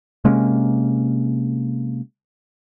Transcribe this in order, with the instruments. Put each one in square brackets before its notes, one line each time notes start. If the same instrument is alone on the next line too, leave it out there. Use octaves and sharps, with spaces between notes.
[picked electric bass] C3 G#3 A#3 C#4